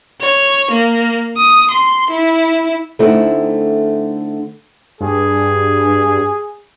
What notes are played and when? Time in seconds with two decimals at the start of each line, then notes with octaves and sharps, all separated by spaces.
0.21 C#5
0.71 A#3
1.38 D#6
1.71 C6
2.11 E4
2.99 D3 A3 C4 D#4 E4
5.01 G2 G#4